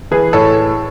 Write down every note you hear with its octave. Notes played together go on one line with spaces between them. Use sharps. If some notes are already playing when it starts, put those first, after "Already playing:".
E3 G#4 B4
A2 A4 C#5